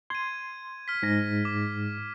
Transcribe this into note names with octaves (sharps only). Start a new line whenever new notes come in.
C6 G#6 D#7
F6 B6
G#2 A#6
D6